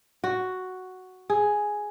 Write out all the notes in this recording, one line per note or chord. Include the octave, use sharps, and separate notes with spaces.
F#4
G#4